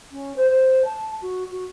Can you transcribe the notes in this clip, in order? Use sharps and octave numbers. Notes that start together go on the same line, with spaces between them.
C#4
C5
C5
A5
F#4
F#4